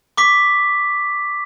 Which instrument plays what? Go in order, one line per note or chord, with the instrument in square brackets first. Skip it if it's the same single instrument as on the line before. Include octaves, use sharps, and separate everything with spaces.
[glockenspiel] C#6 D6 B6